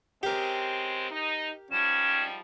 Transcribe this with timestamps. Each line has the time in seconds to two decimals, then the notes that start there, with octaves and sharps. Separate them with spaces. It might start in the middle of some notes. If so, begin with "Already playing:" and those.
0.23 C#3 G#3 C4 G4 A#4
1.10 D#4
1.72 G#2 F3 G3 C#4 E7